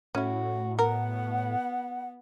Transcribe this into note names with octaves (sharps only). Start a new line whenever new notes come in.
A2 C#4 E4 F#4
B3 A#4 F#5